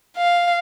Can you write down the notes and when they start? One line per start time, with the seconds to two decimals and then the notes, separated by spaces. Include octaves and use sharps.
0.17 F5